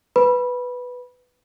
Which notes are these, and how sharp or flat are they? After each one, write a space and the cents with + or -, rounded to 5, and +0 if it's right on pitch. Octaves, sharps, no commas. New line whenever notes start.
B4 +0 B5 -15